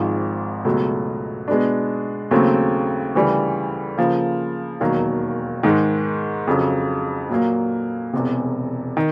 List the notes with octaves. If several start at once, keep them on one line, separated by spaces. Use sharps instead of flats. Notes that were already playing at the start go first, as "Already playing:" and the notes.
Already playing: G#1 G#2 F3
C#2 B2 F#3 A3
B2 G#3 B3 D4
D#2 C#3 F#3 A3 C4
D2 C#3 E3 G3
C#3 F3 A#3
E1 D#2 D#3 F#3 A#3
G#2 D#3 G#3
F2 C#3 F#3
A#2 F#3 A#3
E1 E2 C3
D#3